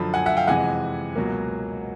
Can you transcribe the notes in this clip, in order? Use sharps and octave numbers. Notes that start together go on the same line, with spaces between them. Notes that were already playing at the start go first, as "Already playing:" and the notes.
Already playing: F#2 D3 F3 A5 B5
F#5 G#5
E5 F#5
F5 G5
F2 C3 E3 G#3 F#5 G#5
C#2 B2 F#3 A#3